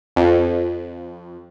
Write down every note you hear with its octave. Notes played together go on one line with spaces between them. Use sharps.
F2